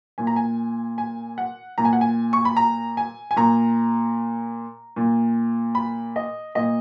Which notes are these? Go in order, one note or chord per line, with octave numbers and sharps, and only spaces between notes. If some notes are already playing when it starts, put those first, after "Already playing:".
A#2 G#5
A#5
G#5
G#5
F#5
A#2 A#5
G#5
F#5
G#5
C#6
B5
A#5
G#5
G#5
A#2 A#5
A#2
B5
D#5
A#2 D#5